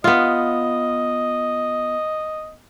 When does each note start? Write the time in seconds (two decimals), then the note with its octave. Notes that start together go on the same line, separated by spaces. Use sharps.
0.04 B3 F4 D#5